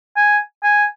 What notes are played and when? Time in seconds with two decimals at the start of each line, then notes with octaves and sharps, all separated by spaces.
0.16 G#5
0.63 G#5